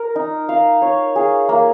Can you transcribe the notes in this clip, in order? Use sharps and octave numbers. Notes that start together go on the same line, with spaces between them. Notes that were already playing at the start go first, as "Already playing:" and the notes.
Already playing: A#4
D#4
F5
C#5
G#4
A#3